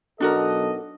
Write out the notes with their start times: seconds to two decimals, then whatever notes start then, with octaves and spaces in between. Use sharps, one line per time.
0.20 B1 D4 F#4 A4 A#4 D#5